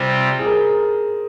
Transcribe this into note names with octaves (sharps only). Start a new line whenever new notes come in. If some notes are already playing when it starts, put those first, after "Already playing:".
Already playing: C3 G3 C4 F4 C5
G#4
A#4